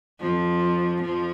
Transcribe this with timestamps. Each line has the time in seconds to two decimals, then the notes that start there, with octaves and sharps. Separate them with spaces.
0.20 F2 F3
1.02 F2 F3